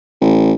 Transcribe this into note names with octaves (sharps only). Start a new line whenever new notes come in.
A1